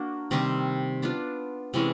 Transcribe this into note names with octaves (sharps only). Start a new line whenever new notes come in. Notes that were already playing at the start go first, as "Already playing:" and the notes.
Already playing: A#3 D4 F#4
C3 D#3 G3 C4
B3 D4 F4
C3 E3 G#3 C#4